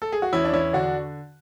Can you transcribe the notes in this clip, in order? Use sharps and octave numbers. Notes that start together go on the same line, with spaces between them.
A4
G#4
F#4
E2 C#4 E4
D4
E2 C#4 E4
D3 D4 F#4